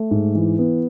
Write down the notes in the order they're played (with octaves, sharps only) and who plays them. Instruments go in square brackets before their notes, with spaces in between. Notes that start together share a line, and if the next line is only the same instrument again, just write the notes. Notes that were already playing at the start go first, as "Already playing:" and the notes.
Already playing: [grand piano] A3
G#2
E3
B3